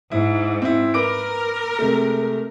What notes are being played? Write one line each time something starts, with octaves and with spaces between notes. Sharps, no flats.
G#2 E4
C4 E4
A#4 B4 D6 D7
C3 G#3 A3